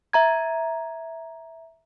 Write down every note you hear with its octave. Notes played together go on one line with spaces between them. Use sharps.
E5 A#5 G#6